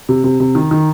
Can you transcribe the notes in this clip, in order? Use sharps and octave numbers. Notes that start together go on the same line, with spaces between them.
C3
C3
C3
D#3
D#3